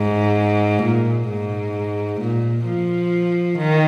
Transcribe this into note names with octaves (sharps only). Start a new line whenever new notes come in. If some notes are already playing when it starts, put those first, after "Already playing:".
Already playing: G#2
A#2
G#2
A#2
F3
D#3